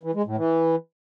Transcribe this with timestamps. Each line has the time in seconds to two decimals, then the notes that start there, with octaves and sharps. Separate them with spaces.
0.03 E3
0.15 G#3
0.26 A2
0.37 E3